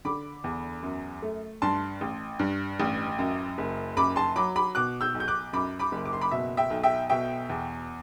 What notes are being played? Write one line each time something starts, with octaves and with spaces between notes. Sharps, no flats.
D3 B5 D6
E2
F#2
A3
G2 A5 C6
A1
G2
A1
F#2
F#1
F#2 B5 D6
A5 C6
F#3 B5 D6
B5 D6
B2 D6 F#6
E6 G6
B1
G6
D6 F#6
F#2 B5 D6
B5 D6
F#1
D6
C6
B5 D6
B2 E5
E5 G5
B1
E5 G5
B2 E5 G5
E2